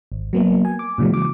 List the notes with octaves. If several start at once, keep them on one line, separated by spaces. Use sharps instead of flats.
G#1
F#3 A#3 B3
G#5
D6
A#2 C#3 E3 F#3 G#3
D6